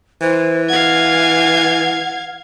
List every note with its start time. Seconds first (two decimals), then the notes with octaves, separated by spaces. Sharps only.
0.22 E3 C5
0.69 F5 F#5 G#6